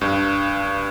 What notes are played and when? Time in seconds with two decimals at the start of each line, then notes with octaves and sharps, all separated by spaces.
0.01 G2